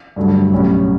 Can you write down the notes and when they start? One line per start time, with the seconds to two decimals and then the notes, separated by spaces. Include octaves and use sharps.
0.16 G2 D3 F#3 A3 D4
0.51 B1 A2 G3 C#4